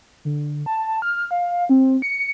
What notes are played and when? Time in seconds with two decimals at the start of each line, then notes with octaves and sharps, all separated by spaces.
0.25 D3
0.66 A5
1.02 F6
1.31 F5
1.69 C4
2.02 C#7